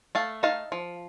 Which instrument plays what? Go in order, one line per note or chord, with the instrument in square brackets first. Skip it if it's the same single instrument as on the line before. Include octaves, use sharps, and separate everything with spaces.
[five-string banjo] A3 F5 A5
D#4 F5 A5
F3